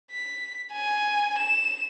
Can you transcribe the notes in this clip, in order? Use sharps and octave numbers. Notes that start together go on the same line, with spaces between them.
B6
G#5
E7